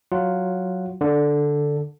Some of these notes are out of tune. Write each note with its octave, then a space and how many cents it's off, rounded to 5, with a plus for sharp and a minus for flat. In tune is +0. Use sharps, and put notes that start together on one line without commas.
F#3 +0 F4 +0 F#5 +0
D3 +0 D4 +0